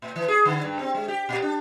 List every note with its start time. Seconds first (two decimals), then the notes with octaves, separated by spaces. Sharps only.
0.02 A2
0.16 E3
0.28 G#4
0.45 D3
0.63 G2
0.79 C4
0.95 G#3
1.08 G4
1.29 A#2
1.42 D4